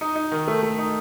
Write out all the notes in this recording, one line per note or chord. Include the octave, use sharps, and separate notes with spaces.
D#4
D#4
D#3
A3
A3
D#4